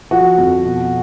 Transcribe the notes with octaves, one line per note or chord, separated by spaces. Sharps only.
F3 F#4
F2
B2